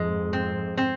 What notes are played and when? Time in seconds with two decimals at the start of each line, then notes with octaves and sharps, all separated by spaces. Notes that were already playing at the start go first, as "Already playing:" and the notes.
Already playing: F2 G#2 G#3
0.33 C4
0.77 C4